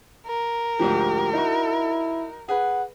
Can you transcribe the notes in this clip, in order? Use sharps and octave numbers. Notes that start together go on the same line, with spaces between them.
A#4
D2 G#2 F3 G4
D#4 E4 F#4
G#4 B4 F#5